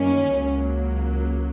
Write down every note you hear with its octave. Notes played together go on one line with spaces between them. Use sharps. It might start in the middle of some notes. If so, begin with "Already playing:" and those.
Already playing: F#2 D#3 A#3 C#4
C#2 C#3 F#3 A#3